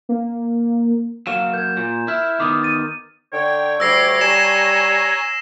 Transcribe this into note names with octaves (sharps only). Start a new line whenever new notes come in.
A#3
F#3 A#3 F5 E7
A#4 G6 G#6
A#2
E4 F6
D#3 B3 D6 D#6
A6 D#7
D3 C#5 G5
D2 G3 D6 E6 A#6 C7
G3 G#5 A#5 A#6 E7